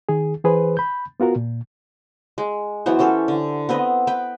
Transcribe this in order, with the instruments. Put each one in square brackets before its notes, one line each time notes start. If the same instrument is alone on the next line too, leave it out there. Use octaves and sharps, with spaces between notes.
[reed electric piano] D#3 G#4
E3 G#4 B4 C5
B5 G6
B3 F4 F#4 A#4
A#2
[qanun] G#3
E3 F#3 B3 C5
C#4 G4 A4 C5
D3
B3 C4 B4 D#5
B4 G5